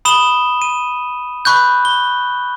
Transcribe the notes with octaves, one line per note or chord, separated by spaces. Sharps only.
B5 D#6 E7 G7
D#7
B5 C#6 F#6 G6
G7